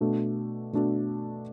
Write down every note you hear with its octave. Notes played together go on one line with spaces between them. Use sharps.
B2 A3 D4 F#4 A4
B2 A3 D4 F#4 A4